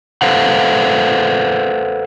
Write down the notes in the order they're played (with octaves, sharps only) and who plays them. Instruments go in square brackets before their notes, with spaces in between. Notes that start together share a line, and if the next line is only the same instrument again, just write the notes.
[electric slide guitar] A4 B4 C5 F5 F#5